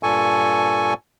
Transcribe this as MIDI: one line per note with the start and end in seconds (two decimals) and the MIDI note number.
0.03 0.94 43
0.03 0.94 46
0.03 0.94 69
0.03 0.94 80
0.03 0.94 85